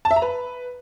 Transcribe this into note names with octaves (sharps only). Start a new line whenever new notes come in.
A5
E5
A#5
B4